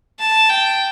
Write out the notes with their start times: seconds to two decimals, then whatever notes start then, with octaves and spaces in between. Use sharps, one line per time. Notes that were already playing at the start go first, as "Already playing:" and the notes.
0.19 A5
0.49 G5